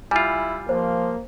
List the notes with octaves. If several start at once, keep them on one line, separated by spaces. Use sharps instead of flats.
G3 E4 F4 G#5
F3 A#3 C5